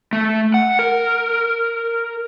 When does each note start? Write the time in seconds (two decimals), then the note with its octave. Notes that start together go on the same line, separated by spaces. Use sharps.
0.13 A3
0.54 F#5
0.79 A#4